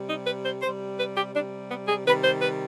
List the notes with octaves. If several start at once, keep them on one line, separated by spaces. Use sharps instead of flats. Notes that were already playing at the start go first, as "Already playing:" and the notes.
Already playing: C3 G3
D#4
B4
C5
C3 G3 C5
B4
G4
C3 G3 D4
B3
G#4
C3 D#3 G3 B4
C5
B4